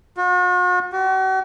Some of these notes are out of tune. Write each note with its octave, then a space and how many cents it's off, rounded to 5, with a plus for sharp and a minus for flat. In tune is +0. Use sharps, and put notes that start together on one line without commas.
F#4 -45
F#4 +40